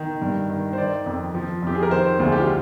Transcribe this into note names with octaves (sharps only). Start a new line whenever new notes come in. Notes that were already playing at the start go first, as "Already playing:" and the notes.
Already playing: D#3
G2
D#3
C5
D#3 D5
F2
F3
F2 G4
G#4
A#4
D#3 C5
D2
G#4
G4
F4